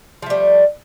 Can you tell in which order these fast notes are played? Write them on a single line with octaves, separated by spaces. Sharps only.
F3 A3 G3